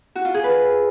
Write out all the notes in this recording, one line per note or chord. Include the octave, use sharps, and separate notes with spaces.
F#4
F4
G#4
B4